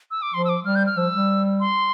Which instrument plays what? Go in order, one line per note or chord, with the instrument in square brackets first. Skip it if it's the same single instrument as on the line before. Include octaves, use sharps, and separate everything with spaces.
[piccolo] E6
D6
[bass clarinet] F3 [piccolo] C6
[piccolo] E6
D6
[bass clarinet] G3 [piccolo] F6
[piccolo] G6
F6
[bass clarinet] F3 [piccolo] E6
[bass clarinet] G3
[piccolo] C6